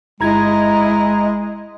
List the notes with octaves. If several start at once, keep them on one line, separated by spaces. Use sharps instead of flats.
G1 G#3 E4 D#5 A#5 G#6